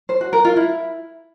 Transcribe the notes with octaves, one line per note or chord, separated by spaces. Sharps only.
C5
F#4
A#4
F4
E4